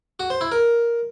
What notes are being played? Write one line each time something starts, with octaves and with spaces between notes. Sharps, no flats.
F#4
C5
E4
A#4